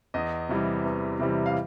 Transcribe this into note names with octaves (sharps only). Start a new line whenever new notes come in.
E2 D#5
C3 E3 G3
E2
C3 E3 G3
F5